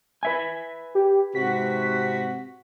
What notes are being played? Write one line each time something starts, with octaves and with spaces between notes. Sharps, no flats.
B4 E5 G#5
G4
G#2 C3 F#4 B6